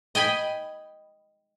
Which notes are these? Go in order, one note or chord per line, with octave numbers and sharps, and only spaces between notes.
D#5 G5 G#5 B5